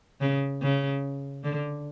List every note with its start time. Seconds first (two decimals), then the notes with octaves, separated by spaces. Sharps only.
0.21 C#3
0.62 C#3
1.44 D3